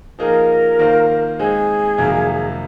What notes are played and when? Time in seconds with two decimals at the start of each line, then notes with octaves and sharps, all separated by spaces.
0.19 F3 A#3 D#4 G#4 A#4
0.79 D#3 A#3 F4 C5
1.39 G#3 C4 D#4 G#4
1.98 F2 C3 D#3 F#3 A#3